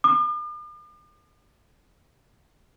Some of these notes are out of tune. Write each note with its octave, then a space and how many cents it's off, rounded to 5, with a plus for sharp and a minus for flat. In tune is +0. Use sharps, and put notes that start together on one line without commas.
D6 +45